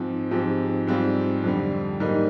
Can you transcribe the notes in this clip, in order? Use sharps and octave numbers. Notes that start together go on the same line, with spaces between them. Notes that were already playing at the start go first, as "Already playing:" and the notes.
Already playing: G#2 F3 C4
G#2 F3 C4 G4
G#2 G3 C4 F4
F2 D3 G3
G#2 G3 A#3 D#4